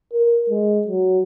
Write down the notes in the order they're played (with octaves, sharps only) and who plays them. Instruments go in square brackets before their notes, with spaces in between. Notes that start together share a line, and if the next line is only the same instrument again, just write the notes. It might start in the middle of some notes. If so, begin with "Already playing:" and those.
[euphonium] A#4
G#3
F#3